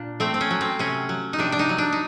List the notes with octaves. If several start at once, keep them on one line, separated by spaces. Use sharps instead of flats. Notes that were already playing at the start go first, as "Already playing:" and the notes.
Already playing: A#2 D4
A3 C4
C4
C#4
F#3
C4
C3 C#4
F#3
D#4
C3 D4
D4
D#4
F#3
D4
D#4